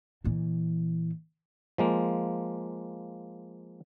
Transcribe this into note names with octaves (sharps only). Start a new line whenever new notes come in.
A#2 E3
F3 G#3 A#3